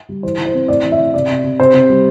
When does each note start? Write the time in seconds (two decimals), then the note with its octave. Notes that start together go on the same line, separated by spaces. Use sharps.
0.09 G3
0.23 E3 C5
0.38 E3
0.46 C5
0.54 C4
0.68 A2 D5
0.83 E3
0.92 E5
0.98 E3
1.14 C3 D5
1.29 C3
1.44 C3
1.60 C3 C5
1.74 C3
1.89 G3